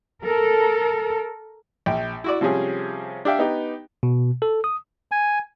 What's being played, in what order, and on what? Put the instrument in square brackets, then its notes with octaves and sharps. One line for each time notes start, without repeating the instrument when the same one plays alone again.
[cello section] A4 A#4
[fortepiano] A#1 G5
E4 F#4 D5
C3 F3 G3 C#4 G#4
D4 G4 D5 E5 F5 G5
B3 D#4 G4
[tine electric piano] B2
A4
D#6
[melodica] G#5